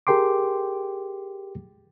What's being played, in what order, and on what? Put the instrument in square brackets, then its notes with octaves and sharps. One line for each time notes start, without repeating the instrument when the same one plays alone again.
[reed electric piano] G4 G#4 A#4 G5 C6 D6